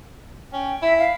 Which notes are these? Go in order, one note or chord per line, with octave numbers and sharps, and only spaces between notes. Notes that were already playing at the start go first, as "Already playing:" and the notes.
C#4 G5
E4 E5
F5